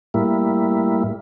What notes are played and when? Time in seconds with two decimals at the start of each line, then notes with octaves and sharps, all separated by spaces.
0.14 A2 G3 A#3 E4